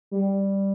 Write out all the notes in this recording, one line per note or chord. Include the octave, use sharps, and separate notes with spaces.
G3